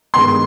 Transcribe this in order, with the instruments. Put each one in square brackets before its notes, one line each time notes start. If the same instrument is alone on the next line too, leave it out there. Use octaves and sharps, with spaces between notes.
[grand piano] G2 D#3 G#3 B3 [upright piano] C6